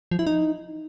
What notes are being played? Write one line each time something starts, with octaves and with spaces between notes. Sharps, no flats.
F3
E4
D#4